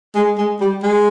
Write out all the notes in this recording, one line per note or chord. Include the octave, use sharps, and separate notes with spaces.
G#3
G#3
G3
G#3